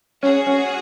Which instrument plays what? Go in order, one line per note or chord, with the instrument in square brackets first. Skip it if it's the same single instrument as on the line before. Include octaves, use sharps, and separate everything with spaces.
[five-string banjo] C#4 [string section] F#4 G#4
[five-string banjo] C#4